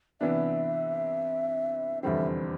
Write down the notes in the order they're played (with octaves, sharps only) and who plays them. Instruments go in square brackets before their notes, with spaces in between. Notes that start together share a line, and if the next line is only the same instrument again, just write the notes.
[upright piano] C3 E3 B3 D4 [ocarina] E5
[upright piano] F1 E2 D3 G3 C4 [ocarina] E5 G5